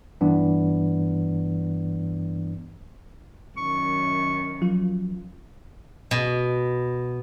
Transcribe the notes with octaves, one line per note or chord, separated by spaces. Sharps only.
G2 E3 B3 D4
F#2 D#3 C#6
F3 F#3 F4
B2